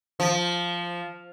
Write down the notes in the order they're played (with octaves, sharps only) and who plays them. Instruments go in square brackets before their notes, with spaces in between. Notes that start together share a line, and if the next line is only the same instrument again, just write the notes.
[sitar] F3